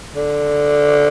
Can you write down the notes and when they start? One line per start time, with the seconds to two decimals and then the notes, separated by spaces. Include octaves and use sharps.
0.15 D3